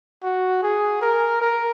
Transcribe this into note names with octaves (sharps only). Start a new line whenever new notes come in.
F#4
G#4
A#4
A#4